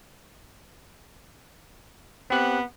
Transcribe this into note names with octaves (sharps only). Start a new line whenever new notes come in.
B3 C4 G4 F#6